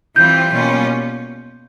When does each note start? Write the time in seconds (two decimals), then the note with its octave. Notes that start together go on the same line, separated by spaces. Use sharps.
0.16 E3 G3 C4 F4 G6
0.51 B2 G3 A#3 C#4 F4